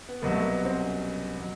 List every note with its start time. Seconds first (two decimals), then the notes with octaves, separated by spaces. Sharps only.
0.09 B3
0.22 C2 B2 F#3 A#3
0.32 A3
0.42 A#3
0.51 B3
0.65 C4
0.79 C#4
1.38 B2 F#3